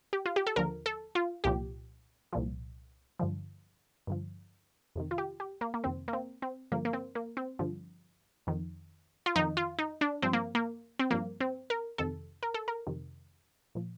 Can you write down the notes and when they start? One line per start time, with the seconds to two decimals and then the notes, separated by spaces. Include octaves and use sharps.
0.13 G4
0.26 F4
0.36 G4
0.47 A4
0.56 D#2 D3 F3 A#4
0.86 A4
1.15 F4
1.44 C2 A#2 F3 G4
2.33 C2 A#2 F3
3.19 G2 D3 F3
4.07 G2 D3 F3
4.95 F2 C3 D#3
5.11 F4
5.18 G4
5.40 G4
5.61 A#3
5.74 A#3
5.84 F2 C3 D#3 C4
6.08 A#3
6.13 C4
6.42 C4
6.72 G2 D3 F3 A#3
6.85 A#3
6.93 C4
7.15 A#3
7.37 C4
7.59 G2 D3 F3
8.47 F2 D#3
9.26 F4
9.35 F2 D#3 D#4
9.57 F4
9.79 D#4
10.01 D4
10.22 G2 F3 C4
10.33 A#3
10.55 A#3
10.99 C4
11.11 G2 F3 A#3
11.41 C4
11.70 A#4
11.98 F2 C3 D#3 A4
12.43 A#4
12.54 A4
12.68 A#4
12.87 F2 C3 D#3
13.75 A#2 F3